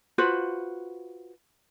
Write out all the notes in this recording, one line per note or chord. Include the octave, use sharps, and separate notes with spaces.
F4 F#4 B4 C5